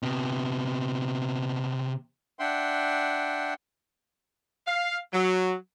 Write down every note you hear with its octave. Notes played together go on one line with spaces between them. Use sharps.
C3 B3
D4 E5 F#5 G5 C6
F5
F#3